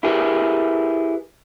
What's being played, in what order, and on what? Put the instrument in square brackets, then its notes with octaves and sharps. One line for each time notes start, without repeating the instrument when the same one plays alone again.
[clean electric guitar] E4 G4 G#4 A#4 B4